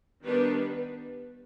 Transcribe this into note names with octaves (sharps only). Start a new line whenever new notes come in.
D#3 G3 B3 D4 B4